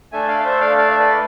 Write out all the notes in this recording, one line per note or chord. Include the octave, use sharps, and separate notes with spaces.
A3 D4 A4 E5 G#5
D5 F5
F5
C5 E5
D5 F5
D5 F5
E5
B4 D5